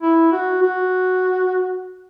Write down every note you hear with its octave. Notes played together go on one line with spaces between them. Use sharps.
E4
F#4
F#4